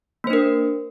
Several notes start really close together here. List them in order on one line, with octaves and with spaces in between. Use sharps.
A#3 C5 D4 A#4